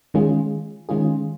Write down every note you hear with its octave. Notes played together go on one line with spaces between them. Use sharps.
D#3 G#3 C#4 F4 G#4
D#3 G#3 C#4 F4 G#4